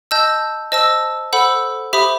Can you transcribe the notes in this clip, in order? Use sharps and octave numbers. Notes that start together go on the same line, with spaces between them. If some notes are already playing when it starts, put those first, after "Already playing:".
D#5 A5 E6 G6
C5 D#5 A5 E6
A4 C5 F#5 B5 E6
G4 C5 E5 B5 D#6